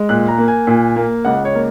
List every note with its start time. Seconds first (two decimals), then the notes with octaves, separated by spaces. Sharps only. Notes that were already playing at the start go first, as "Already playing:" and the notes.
Already playing: G#3
0.09 A#2 F#6
0.28 A#5
0.38 A#3
0.48 G#5
0.67 A#2
0.96 A#3
1.25 C#2 F#5
1.45 C#5
1.55 A#3